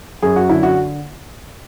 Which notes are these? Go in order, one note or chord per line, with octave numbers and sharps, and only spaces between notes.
F#2 G#4
F#4
D3 E4
F#4